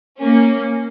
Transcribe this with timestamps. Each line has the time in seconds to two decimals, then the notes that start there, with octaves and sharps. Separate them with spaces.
0.18 A#3 C#4